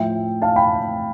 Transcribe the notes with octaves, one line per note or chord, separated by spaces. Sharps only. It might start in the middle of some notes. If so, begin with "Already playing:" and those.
Already playing: A2 F3 E5 G5
F5 A5
G5 B5